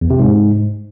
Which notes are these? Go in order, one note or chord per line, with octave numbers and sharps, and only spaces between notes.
E2
C3
G#2